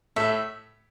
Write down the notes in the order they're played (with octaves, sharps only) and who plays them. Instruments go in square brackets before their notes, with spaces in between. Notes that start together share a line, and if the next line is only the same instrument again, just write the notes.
[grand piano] A2 A3 [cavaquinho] E5